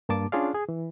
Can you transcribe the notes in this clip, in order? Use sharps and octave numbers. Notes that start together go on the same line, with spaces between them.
G2 A#3 A5 D6
C#4 D4 F4 G#4 D5 F5
G#4
E3